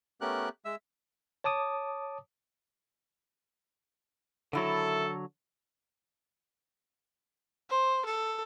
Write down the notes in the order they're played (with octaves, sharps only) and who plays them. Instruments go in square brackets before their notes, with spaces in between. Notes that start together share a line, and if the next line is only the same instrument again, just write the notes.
[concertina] A3 B3 C#4 G4 A#4 F#6
G#3 E5 E6
[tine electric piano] C#5 A5 D6 D#6
[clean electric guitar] D3 F#3 [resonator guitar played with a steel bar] D#3 E4 [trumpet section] A4
[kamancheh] C5
A4